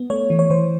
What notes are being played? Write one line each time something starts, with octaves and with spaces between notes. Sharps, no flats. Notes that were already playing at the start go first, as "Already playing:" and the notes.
Already playing: B3
A3 C#5
E3
C#5
E3 C5